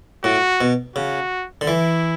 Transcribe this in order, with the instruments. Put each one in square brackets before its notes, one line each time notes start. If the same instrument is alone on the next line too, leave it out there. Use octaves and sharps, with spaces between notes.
[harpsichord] A2 [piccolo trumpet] F#4
[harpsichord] B2
[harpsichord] C#3 [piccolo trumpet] F#4
[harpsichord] D3
[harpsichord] E3 [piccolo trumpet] E4